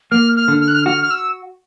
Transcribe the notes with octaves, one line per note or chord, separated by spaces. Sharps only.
A#3 F6
F6
D3
F6
F#6
F6
F#4 F6
F6
E6